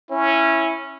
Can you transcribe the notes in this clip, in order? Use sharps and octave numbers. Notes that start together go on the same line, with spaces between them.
C#4 E4